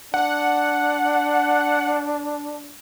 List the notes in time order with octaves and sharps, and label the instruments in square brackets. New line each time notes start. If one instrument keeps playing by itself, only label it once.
[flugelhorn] D4 [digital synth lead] F#5